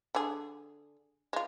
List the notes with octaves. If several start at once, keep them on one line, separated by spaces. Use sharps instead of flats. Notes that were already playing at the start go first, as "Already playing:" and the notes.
D3 G#4
G#3 F4